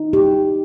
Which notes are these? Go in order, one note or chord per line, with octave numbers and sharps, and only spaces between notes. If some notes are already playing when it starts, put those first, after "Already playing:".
Already playing: D#4
G4